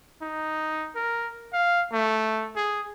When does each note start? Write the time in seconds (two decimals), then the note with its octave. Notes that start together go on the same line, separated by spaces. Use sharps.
0.22 D#4
0.95 A#4
1.53 F5
1.92 A3
2.56 G#4